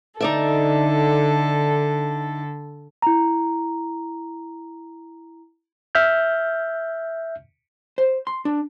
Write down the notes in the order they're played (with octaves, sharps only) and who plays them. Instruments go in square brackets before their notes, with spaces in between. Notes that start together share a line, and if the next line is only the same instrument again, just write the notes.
[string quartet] D3 A4 [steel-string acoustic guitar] D#4 D5 E5
[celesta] E4 A#5
[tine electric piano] E5 F6 G6
[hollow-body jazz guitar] C5
C6
D4